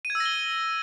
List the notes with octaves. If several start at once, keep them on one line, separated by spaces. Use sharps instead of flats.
D#7
G#6
E6
A#6
G7